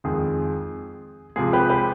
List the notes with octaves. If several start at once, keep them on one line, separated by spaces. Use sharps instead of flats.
F2 D#3 G#3 G#4
C3 F3 G#3 G#4
G4 B4
G4 B4